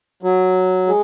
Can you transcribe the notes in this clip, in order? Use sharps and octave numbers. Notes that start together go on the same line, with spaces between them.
F#3
G#3